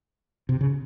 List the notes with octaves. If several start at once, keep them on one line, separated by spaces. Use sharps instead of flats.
C3
C#3